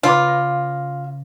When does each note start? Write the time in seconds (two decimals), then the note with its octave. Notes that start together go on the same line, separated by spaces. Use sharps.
0.03 C#3 F4 B4 D6
0.28 A#6